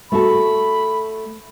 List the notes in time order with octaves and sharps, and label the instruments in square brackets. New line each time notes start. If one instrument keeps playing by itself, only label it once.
[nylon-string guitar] A3 F#4 A4 [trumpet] B5